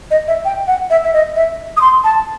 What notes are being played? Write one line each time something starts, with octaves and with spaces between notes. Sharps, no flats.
D#5
E5
G5
F#5
E5
E5
D#5
E5
D#6
C6
A5